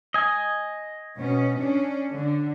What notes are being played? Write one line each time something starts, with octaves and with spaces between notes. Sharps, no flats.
D#5 G#5
B2 C#4
C#4 D4
D3